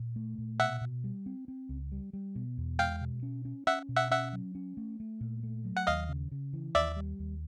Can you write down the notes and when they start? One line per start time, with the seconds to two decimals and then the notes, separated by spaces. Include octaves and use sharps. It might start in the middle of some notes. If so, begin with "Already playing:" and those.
Already playing: A#2
0.16 A3
0.38 A#2
0.60 B2 E5 F#5
0.81 B2
1.04 G3
1.26 C4
1.48 C4
1.69 C#2
1.92 G3
2.13 G3
2.35 B2
2.58 E2
2.79 G#3 F5 G5
3.01 B2
3.23 C#4
3.45 C#4
3.67 C#4 E5 F#5
3.89 B2
3.96 E5 F#5
4.11 C#4 E5 F#5
4.33 F#3
4.55 C#4
4.77 A3
5.00 A3
5.21 A#2
5.43 A3
5.65 F#3
5.77 F#5
5.87 D#2 D#5 F5
6.09 C#3
6.31 C#3
6.53 E3
6.75 D#2 D5 E5
6.96 G3
7.19 D#2